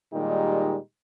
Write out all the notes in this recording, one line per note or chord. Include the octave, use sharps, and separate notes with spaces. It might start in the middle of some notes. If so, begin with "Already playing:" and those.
A#2 D#3 G3 G#3 D#4 G4